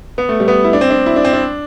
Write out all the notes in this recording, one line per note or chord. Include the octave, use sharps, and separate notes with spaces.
B3
A3
G3
B3
E4
D4
C4
D4
E4
D4
C4
D4